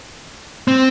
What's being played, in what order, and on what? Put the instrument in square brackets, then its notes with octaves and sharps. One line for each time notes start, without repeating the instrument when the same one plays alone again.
[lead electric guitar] C4